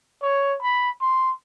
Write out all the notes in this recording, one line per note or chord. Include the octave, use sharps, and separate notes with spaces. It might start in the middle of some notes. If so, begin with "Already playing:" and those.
C#5
B5
C6